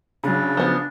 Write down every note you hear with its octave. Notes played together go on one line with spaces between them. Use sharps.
C#3 F#3 D4
F3 B3